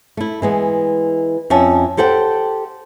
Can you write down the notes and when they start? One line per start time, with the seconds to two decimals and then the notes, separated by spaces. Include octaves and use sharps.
0.17 A3 E4
0.42 E3 G#3 B3
1.50 F2 C#4 E5 A5
1.97 G4 A4 C5 F#5 G5